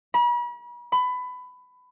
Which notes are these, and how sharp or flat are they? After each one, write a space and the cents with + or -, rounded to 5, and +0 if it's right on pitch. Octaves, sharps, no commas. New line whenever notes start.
B5 -40
B5 +20